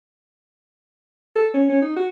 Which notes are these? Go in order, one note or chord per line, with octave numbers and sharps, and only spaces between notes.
A4
C#4
C#4
D#4
F#4